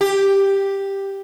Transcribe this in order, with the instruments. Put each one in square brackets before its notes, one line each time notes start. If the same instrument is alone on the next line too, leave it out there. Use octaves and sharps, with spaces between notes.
[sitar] G4